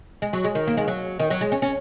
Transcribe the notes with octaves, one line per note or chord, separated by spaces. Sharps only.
G#3
F#3
G#3
D#3
A#3
G#3
F#3
D#3
F#3
G#3
C#4
C#4